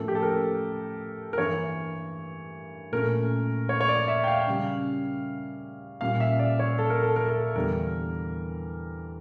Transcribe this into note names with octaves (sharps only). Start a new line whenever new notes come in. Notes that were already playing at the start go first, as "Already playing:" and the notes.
Already playing: A2 F3 A#3 C#4 A4
G4
A4
A#4
A#4
G2 E3 A#3 C#5
A#2 A3 C#4 A#4
C#5
C#5
D5
E5
G5
F5
C#3 G3 C#4
A#2 G3 C#4 F5
E5
D5
C#5
A4
A#4
A4
A#4
A4
E2 D3 G3 A#4